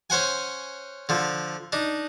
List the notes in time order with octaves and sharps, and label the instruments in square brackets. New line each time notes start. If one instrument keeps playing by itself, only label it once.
[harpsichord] C#4 C5 F#5 G#5
D3 F3
D4 D#4